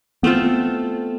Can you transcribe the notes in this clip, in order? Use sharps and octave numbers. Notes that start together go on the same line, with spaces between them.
A3 B3 C4 F4 A4